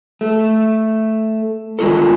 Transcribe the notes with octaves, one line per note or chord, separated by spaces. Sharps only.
A3
D#3 G#3 F4 A4